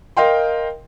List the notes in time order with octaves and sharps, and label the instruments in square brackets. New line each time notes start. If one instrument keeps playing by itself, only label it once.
[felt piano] A#4 D#5 F5 G5 C6